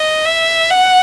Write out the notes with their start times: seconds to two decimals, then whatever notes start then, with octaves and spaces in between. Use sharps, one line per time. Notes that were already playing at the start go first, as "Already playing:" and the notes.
Already playing: D#5
0.26 E5
0.70 F#5